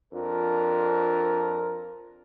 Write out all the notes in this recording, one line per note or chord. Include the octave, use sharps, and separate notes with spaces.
F2 D4 F4 A#4